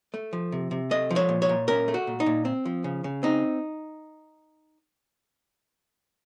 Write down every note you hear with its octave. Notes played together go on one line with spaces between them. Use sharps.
A3
F3
C3
C3
A3 D#5
F3
C#5
A#2
C#5
A#2
C#4 A#4
A3
F#4
A#2
D#4
A#2
C4
F3
C#3
C#3
C4 D#4